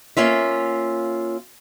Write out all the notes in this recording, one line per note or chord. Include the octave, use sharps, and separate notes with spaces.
A#3 C#4 F4 E5